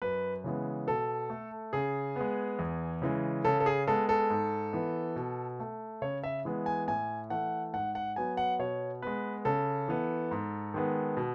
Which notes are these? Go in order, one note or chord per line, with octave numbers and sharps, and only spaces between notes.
F#2 B4
C#3 E3 G#3 B3
B2 A4
A3
C#3 G#4
G#3 B3
E2
C#3 E3 G#3
C#3 A4
A4
G#4
G#3 B3 A4
A4
G#2
E3 B3
B2
A3
C#3 C#5
E5
E3 G#3 B3
G#5
A2 G#5
E3 A3 F#5
G#2 F#5
F#5
F#3 B3 G#5
F#5
B2 C#5
G#3 B3 B4
C#3 A4
E3 B3
G#2
D#3 G#3 B3
B2